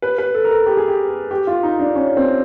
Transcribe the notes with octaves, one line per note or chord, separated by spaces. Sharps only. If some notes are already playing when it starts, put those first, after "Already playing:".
B4
B4
A4
A#4
A4
G4
G#4
G4
G4
F4
D#4
D4
C#4
C4